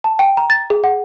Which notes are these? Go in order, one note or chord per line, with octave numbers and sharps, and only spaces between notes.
A5
G5
A#5
A6
G#4
F#5